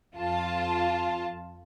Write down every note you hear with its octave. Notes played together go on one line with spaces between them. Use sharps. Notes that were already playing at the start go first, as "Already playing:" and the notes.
F2 F4 A5